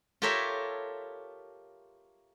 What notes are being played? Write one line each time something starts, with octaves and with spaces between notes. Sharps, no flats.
F4 G4 A4 A#4 C#5 E5